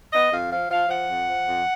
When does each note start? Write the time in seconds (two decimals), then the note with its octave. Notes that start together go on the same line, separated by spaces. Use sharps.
0.12 B3 D#5
0.32 F2 F5
0.51 F3 F5
0.70 F3 F5
0.89 F3 F#5
1.08 F2
1.28 F3
1.47 F2